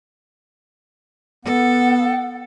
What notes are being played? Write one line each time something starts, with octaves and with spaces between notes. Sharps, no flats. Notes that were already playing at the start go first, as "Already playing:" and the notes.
B3 A4 F#5